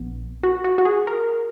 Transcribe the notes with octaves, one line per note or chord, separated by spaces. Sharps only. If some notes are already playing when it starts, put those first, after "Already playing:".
Already playing: A#1 B3
F#4
F#4
F#4
G#4
A#4